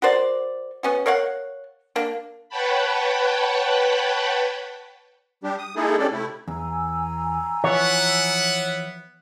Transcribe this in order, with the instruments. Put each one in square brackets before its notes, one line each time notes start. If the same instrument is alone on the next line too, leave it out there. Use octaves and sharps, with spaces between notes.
[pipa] F#4 A#4 C5 D5
B3 C#4 F#4
A#4 C#5 F5 F#5
A#3 D4
[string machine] B4 C#5 F#5 G5 A5 B5
[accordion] G3 D4 G4
D#6
G#3 A#3 D#4 E4 G#4 A4
C#4 D4 G4 A4 D5
C3 A3 E4
[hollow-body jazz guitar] E2 [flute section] G#5 A#5 E6
[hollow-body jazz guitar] E3 F3 [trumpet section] B3 E5 F#5 [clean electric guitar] C#5